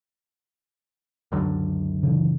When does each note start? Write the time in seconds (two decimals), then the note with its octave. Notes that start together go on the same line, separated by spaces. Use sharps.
1.32 C#2 F#2 D3
2.03 C#3 E3